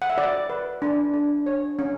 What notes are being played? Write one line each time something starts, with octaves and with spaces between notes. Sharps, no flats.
F#5
E5
F#4 D5
B4
D4
D4
C#5
C#4